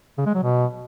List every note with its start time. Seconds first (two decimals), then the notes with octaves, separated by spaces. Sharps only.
0.18 C#3
0.26 G#3
0.34 F#3
0.43 B2